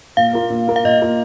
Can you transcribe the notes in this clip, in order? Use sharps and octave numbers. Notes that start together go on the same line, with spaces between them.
A#2 F5
A#3 F4 A#4
A#2
A#3 F4 A#4
F5
A#2 D#5
A#3 F4 A#4